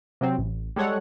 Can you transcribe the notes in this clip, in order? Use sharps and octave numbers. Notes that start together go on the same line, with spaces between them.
C3 F#3 C4
A1
G3 G#3 A4 C#5 F#5